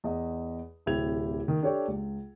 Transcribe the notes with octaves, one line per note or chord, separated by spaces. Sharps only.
E2 D#5
D1 C3 E4 G4 G#6 F7
D#3
D4 G4 A4 C#5 G5
C#2